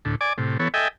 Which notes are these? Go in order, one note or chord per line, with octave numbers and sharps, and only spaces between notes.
D2 A2
D5 G#5 D6
A2 C3
E3 B3 A4 C#5
A4 D#5 E5 G5 G#5